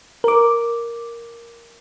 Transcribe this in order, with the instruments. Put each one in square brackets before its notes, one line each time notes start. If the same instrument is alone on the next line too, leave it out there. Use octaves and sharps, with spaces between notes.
[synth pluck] A#4 D6